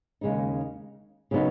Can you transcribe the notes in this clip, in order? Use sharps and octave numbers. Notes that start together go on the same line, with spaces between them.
D#2 C#3 G#3 D#4
C#3 F#3 B3 D#4